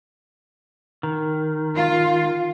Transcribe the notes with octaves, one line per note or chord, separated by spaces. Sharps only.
D#3
F4